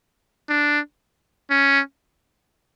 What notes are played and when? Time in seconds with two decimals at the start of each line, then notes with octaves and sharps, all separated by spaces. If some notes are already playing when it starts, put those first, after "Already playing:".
0.49 D4
1.50 C#4